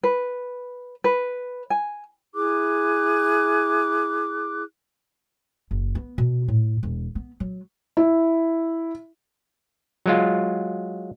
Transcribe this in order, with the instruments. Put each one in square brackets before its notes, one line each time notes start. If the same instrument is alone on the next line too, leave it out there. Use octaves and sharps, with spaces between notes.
[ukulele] B4
B4
G#5
[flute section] E4 G#4 D6 F#6
[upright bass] F#1
B3
B2
A2
E1
B3
F#3
[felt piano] E4
[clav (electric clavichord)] F#3 G#3 F4